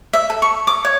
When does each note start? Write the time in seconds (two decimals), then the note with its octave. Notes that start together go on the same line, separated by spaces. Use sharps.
0.13 E5
0.30 A4
0.42 C#6
0.67 D6
0.85 C#5